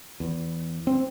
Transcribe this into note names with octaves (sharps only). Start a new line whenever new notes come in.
E2
C4